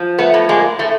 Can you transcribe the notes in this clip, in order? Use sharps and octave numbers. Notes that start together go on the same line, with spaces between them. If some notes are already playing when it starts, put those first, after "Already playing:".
Already playing: F3
A3 B3
A2
G#3 A#3
A2 A3